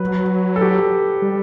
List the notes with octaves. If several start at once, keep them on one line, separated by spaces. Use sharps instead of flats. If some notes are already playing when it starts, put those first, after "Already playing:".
Already playing: F#3 B4
A4
G4
G3